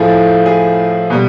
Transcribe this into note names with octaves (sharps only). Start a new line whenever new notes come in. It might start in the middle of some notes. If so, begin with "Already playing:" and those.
Already playing: A2 F3 A3 G#4
G#4
B2 G3